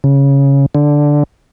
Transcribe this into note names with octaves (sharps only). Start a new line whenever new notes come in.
C#3
D3